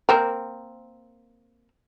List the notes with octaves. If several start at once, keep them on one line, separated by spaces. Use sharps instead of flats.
A#3 C4 A#4